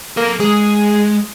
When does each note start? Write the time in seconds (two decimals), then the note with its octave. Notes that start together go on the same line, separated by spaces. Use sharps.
0.17 A#3 A4 F5
0.40 G#3 G#4